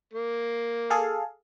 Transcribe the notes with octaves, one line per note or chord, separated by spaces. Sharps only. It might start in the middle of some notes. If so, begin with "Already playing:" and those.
A#3
G#4 A4 F5